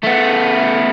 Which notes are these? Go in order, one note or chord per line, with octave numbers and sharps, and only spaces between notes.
A3 B3